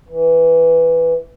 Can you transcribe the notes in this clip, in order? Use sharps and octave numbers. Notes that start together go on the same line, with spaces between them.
E3